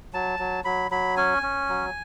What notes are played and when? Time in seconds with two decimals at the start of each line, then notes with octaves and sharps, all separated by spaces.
0.14 F#3 A5
0.39 F#3
0.65 F#3 B5
0.91 F#3 B5
1.17 C#4 G#5
1.43 C#4
1.69 F#3